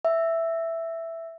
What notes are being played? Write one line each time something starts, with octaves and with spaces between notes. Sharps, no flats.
E5